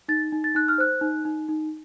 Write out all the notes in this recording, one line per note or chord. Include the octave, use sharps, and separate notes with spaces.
D#4 A6
D#4
A6
D#4 F#6
F6
C5 F#6
D#4
D#4
D#4